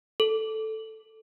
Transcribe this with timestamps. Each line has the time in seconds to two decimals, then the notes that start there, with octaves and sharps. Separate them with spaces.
0.20 A4